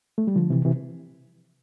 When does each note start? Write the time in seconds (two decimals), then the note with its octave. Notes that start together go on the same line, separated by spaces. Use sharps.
0.18 A3
0.27 G3
0.36 D3 F3
0.50 C3 E3
0.65 C3 E3